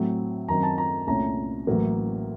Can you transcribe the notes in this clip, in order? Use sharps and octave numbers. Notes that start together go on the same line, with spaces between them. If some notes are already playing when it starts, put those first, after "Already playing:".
Already playing: A2 F#3 C4
F#2 D#3 F#3 C4 A#5
A5
A#5
C2 A#2 A3 C#4 A#5
A1 A2 F#3 A#3